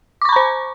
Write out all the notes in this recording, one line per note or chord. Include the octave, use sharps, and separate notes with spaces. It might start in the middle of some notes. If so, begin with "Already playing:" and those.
C5 A#5 B5 C#6 D6